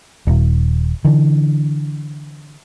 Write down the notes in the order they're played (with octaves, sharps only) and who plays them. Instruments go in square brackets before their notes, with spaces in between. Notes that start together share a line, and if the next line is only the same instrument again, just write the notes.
[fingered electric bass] D#1
D3 E3